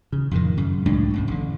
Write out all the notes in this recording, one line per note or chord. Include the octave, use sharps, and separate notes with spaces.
C#3
F2 A2 D#3
F#2 C#3
C#2 A2 G#3 D4
B1 F#2 A2
A1 D3